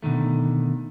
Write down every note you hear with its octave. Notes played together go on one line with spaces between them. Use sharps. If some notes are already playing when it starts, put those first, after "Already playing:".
B2 D3 D#3 A3